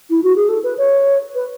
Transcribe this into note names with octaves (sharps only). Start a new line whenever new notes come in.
E4
F#4
G#4
A4
B4
C#5
B4